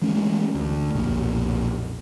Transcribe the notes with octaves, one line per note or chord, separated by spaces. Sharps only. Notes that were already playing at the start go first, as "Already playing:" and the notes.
E3 G#3 A3 C#4
D2
B1 F2 A#2